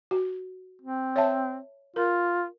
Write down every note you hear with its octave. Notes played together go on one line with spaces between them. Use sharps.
F#4
C4
C#5 E5 A5
F4 A#4